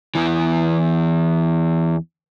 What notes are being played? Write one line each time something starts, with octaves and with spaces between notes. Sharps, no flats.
E2 E3